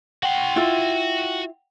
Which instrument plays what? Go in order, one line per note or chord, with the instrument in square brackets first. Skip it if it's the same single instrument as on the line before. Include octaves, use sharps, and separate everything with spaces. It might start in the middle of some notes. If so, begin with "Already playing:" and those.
[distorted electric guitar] F#4 C6 [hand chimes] F#5 G5
[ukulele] E4 F4